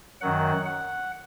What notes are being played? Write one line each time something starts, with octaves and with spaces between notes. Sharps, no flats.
F#2 D#3 F#3 F#5
F#5